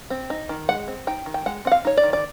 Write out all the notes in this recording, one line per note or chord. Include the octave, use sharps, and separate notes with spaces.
C4
D#4
D#3
G#3 F#5
C4
D#4 G5
D#3
G5
G#3 F#5
C4 F#5
F5
D#4 C#5
D5
D#3
D5